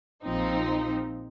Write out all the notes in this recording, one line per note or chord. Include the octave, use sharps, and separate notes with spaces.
A#1 F3 C4 D#4